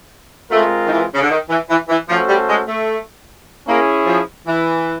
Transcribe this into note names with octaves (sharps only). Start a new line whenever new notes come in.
G#3 A3 C4 F4 A#4
D#3
E3
C#3
D3
D#3
E3
E3
E3
F3 A3 C#4 F#4 A4 C5
G3
G#3
A3
A#3 C#4 E4 G#4
F3
E3